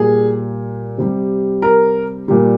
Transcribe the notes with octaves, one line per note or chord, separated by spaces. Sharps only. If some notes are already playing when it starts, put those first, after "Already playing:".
Already playing: A#2 G3 G#4
C3 G3
A#4
A#2 G3